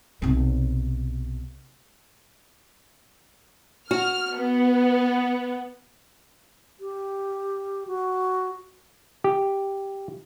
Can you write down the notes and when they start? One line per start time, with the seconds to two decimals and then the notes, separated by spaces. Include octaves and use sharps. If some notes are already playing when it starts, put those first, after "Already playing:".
0.22 B1 C3
3.91 F#4 F6
4.37 B3
6.80 G4
7.87 F#4
9.24 G4